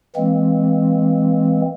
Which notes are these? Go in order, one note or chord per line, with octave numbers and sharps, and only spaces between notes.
E3 G#3 A#3 C4